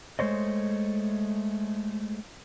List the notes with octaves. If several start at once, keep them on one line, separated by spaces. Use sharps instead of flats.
G#3 A3 C5 C#5 D#5